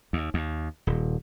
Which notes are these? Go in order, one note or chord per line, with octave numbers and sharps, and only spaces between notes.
D#2
D#2
D#1